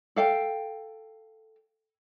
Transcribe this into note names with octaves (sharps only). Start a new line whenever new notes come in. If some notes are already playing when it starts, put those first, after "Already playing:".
A4 F5 G5